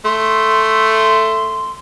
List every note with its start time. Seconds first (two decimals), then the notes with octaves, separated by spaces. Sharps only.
0.05 A3 C6